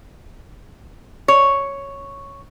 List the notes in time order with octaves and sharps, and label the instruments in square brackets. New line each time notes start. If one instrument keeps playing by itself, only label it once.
[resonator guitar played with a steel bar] C#5